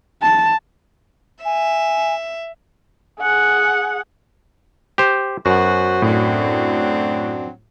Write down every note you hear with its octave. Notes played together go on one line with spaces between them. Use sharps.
A5
E5 G#5
G#4 F#5
G4 C5
F#2 B3 F#4 C5
A2 F#3 C4 D4